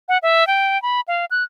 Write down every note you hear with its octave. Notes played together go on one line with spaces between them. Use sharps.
F#5
E5
G5
B5
F5
F#6